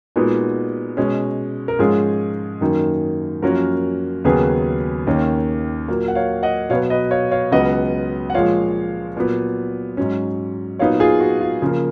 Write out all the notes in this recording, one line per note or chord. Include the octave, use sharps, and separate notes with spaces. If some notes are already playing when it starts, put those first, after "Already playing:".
A#2 G#3 B3 D#4 F#4
B2 G#3 C#4
A#4
G#2 F3 G#3 C#4 F4 G#4
F#2 D#3 A#3 D#4
F#2 F3 A#3 C#4 F#4 A#4
D#2 C#3 F#3 B3 G#4 B4
D#2 D#3 A#3 C#4
A#2 F#3 A#3
F#5
C#5 F5
D#5 F#5
B2 F#3 B3 C#5 F5
B4 D#5
C#5 F5
C#5 F5
C#2 C#3 F#3 B3 D#5 F#5
F#5
A#2 F3 G#3 C#5 F5
A#2 F#3 B3
G#2 F#3 C#4
A#2 F#3 B3 D#4 C#5 F5
F4 G#4
F#4
F4
C#3 F3 A#3